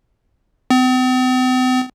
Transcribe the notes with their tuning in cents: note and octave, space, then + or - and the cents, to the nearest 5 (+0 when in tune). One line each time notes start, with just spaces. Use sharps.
C4 -45